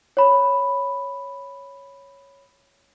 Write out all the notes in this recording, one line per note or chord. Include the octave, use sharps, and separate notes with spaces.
C#5 B5